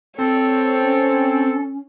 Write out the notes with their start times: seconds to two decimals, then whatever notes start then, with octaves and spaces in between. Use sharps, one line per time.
0.19 C4 A4 C#5
0.82 C#4